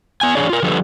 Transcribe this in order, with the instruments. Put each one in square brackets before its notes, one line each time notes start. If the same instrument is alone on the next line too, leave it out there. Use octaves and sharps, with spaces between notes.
[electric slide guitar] B3 G#5
E3 F#3 D4 G#4 C#5 D5
F4 A#4
D3 F3 G3 A4 B4